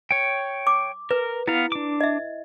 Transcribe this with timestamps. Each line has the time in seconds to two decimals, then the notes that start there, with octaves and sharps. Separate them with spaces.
0.11 C#5 G5
0.67 D6
1.11 A#4 B4
1.48 B3 E4 F5
1.72 D4 D6
2.01 D#5 E5